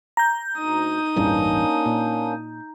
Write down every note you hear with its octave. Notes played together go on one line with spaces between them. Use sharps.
A#5 G6
D2 D#4 D#6
A1 E2 G2 A#3 C#4 D4
A#2